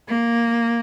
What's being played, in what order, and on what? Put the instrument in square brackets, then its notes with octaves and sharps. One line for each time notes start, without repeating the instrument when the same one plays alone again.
[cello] A#3